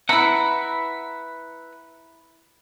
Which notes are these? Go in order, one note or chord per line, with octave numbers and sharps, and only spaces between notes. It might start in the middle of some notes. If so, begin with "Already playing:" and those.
E4 B4 E5 F#5 A#5